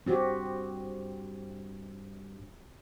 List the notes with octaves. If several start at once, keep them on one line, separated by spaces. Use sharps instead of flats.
G2 C4 F#4 G4